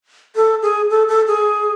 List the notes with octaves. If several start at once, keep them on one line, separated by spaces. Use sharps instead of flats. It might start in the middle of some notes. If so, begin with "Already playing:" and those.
A4
G#4
A4
A4
G#4